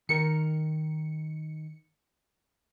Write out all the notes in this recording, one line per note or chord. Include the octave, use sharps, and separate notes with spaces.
D#3 A#4 C#7